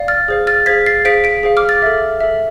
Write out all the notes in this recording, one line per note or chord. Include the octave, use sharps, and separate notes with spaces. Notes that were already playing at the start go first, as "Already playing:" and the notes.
Already playing: D5 F5
F6 A6
G#4 C5 F5
F6 A6
G#4 C5 F5 G#6 B6
A6 C7
G#4 C5 F5 B6 D7
B6 D7
G#4 C5 F5
D6 F6
F6 A6
A4 E5
A4 E5